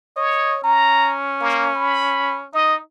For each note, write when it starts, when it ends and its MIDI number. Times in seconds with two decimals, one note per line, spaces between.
0.17 0.59 73
0.17 0.56 75
0.64 2.45 61
0.64 1.14 82
1.41 1.69 58
1.76 2.39 83
2.54 2.79 63
2.54 2.75 75